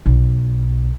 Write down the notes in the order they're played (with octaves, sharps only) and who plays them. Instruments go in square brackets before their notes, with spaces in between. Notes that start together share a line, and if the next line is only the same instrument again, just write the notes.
[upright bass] B1